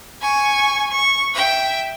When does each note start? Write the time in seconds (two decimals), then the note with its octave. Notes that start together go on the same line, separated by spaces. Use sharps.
0.22 G#5 C#6
0.91 C#6
1.35 E5 G5